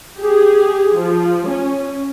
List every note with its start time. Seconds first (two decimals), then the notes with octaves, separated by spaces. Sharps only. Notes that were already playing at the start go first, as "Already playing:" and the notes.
0.17 G4 G#4
0.95 F3
1.47 C#4